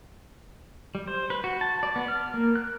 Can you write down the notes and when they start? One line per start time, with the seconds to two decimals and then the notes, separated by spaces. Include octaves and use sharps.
0.95 G3
1.07 C5
1.30 B4
1.44 F#4
1.61 A5
1.83 D5
1.96 B3
2.08 F6
2.34 A#3
2.56 F#6